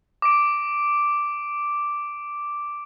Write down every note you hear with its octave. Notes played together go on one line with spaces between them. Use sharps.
D6 D7